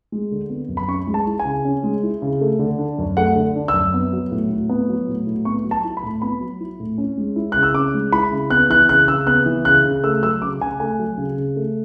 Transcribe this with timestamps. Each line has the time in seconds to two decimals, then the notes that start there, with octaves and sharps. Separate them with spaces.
0.12 G#3
0.32 D3
0.49 B3
0.69 F#2
0.77 B5
0.88 C#4 C#6
1.07 G#3
1.14 A5
1.27 E4
1.39 G#5
1.45 C#3
1.65 C#4
1.83 G#3
2.03 E4
2.22 C#3
2.41 A3
2.59 D3
2.79 D4
2.98 F#2
3.17 A3 F#5
3.36 D3
3.56 D4
3.68 E6
3.74 F#2
3.94 B3
4.13 F#3
4.31 A2
4.50 A2
4.70 B3
4.89 F#3
5.08 A2
5.27 A2
5.45 B3 C#6
5.65 F#3
5.71 A5
5.84 E4
5.97 B5
6.03 A2
6.22 B3 B5
6.41 F#3
6.60 E4
6.80 A2
6.98 C#4
7.18 G#3
7.36 E4
7.52 C#3 F#6
7.63 E6
7.74 C#4 D6
7.94 G#3
8.12 E4 B5
8.32 C#3
8.50 B3 F#6
8.70 E3 F#6
8.89 C#3 F#6
9.08 C#3 E6
9.27 B3 F#6
9.46 E3
9.65 C#3 F#6
9.85 C#3
10.04 A3 E6
10.23 F#3 E6
10.42 C#3 D6
10.60 C#3 G#5
10.80 A3 G#5
10.99 F#3
11.17 C#3
11.38 C#3
11.56 A3